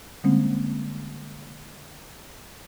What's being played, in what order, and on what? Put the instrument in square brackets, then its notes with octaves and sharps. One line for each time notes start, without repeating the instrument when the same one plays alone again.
[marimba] D3 G3 G#3 A#3 C4 C#4